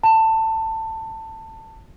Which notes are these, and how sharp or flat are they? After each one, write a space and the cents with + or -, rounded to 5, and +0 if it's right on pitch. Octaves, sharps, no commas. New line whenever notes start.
A5 +20